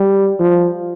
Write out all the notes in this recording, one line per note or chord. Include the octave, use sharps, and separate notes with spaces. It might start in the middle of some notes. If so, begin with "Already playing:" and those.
Already playing: G3
F3